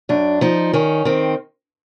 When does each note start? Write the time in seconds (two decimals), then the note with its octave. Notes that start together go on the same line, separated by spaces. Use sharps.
0.09 F#2 D4
0.41 F3 D#4
0.73 D#3 C#4
1.05 D#3 C4